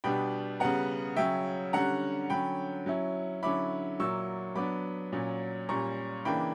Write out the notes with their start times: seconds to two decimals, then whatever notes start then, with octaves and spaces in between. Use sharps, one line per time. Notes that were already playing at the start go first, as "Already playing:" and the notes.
0.04 B2 G3 B3 D4 G5 B5
0.60 C#3 G3 B3 F#5 A#5
1.16 C#3 F#3 C#4 E5 G5
1.73 D3 G3 C#4 F#5 A#5
2.30 D3 F#3 C#4 G5 B5
2.86 F#3 C#4 E4
3.43 D3 F#3 C#4 E4 B5 D6
3.99 A#2 F#3 A#3 E4 C#6 E6
4.56 F#3 B3 D4 B5 D6
5.12 A#2 F#3 C#4
5.69 A#2 G3 C#4 A#5 C#6
6.25 C#3 E3 A#3 D4 G5 B5